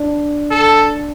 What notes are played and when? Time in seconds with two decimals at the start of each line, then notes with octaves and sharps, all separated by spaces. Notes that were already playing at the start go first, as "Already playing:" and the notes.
Already playing: D4
0.51 A4